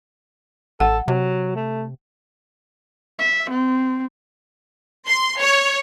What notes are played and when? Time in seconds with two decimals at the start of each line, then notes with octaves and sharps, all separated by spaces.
0.80 A1 A4 F#5
1.08 C3 F#3
1.56 A3
3.19 E5
3.50 C4
5.07 C6
5.40 C#5